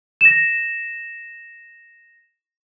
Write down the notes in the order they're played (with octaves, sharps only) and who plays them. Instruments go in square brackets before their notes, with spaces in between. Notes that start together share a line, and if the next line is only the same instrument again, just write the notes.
[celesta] A#6 E7